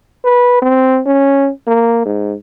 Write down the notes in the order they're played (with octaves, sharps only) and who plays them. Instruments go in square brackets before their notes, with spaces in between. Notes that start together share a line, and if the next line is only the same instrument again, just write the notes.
[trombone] B4
C4
C#4
A#3
G#2